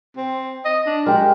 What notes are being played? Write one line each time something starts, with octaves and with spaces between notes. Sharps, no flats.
C4
D#5
D4
G#3 G4 A#4